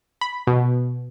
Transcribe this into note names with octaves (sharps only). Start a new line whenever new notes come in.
B5
B2